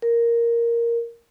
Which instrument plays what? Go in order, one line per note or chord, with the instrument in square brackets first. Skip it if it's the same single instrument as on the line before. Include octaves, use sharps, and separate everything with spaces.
[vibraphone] A#4